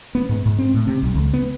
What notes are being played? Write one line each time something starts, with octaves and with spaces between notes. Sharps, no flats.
B3
G#2
G#2
C4
A2
C3
B1
C#2
B3